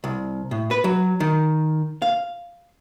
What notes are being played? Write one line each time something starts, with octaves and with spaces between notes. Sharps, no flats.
C2
A2
B4
F#3
D#3
F5